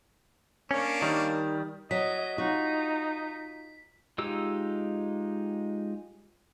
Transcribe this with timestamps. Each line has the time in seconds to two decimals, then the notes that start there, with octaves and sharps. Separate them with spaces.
0.71 A#3 C#4 D4 C#5
1.02 D#3 G3
1.91 F#3 D#5 B6
2.38 D#4 F4 F#4
4.18 G#3 D#4 F4 G4 E6